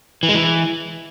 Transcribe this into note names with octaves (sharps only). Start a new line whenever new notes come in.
E3
G#3
E3